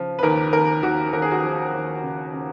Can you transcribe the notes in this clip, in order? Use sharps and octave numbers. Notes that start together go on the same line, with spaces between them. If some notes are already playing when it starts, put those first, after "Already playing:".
Already playing: C#3 F3
B4
D#2 A#4
D#2 A#4
D#2 F#4
D#2 A#4
G#4
F#4
F3 G#4
D#2
C#3
C#3